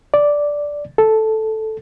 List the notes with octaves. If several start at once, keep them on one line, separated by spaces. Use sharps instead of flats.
D5
A4